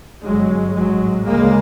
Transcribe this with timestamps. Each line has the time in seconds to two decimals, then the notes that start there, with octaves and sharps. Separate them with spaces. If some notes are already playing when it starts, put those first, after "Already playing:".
0.23 G1 G2 F#3 G#3
0.74 A1 G#2 F#3 G#3
1.25 D2 C#3 G#3 A#3